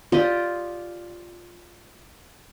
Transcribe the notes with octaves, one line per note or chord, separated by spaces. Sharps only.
F4 G4 D5 D#5